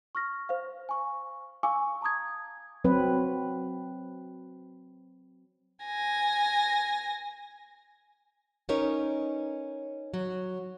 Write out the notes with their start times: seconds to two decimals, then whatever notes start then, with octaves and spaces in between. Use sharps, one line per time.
0.15 C#6 F6 A#6
0.49 C5 F5
0.89 G#5 C#6
1.63 F5 G#5 C#6 D6 E6
2.01 A5 A#5 D6 D#6 G#6
2.84 F#3 C4 B4
5.84 G#5 A#6
8.69 C#4 D#4 A#4 B4 C#5
10.14 F#3